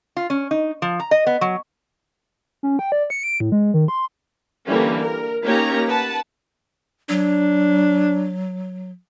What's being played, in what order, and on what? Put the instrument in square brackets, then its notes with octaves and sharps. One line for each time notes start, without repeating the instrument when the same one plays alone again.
[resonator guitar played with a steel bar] F4
C#4
D#4
F3
A#5
D#5
B3
F#3
[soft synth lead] C#4
G5
D5
C#7
D7
A2
G#3
D#3
C6
[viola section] D3 E3 G3 A#3 C#4
A#4
A#3 C#4 D#4 G4 C#5 A#5
B4 F#5 A5
[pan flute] F#3 [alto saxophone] D4